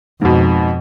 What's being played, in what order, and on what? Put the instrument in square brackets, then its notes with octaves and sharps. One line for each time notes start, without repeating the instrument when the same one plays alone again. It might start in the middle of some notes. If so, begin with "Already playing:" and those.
[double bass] F2 [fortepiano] G#2 B2